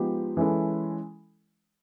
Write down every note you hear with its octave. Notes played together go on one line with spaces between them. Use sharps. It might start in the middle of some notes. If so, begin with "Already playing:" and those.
Already playing: F3 G#3 B3 D#4 G4
E3 G#3 C#4 E4 A4